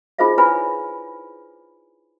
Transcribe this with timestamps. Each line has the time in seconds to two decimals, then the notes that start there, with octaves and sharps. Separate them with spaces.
0.19 D#4 F4 G#4 C5 D#5 F5
0.38 E4 B4 C#5 G#5 B5